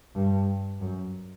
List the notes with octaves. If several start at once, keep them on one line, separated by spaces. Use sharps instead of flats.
G2
F#2